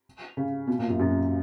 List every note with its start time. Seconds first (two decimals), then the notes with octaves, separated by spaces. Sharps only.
0.37 C#3
0.67 B2
0.79 A#2
0.89 F#2
1.00 F#2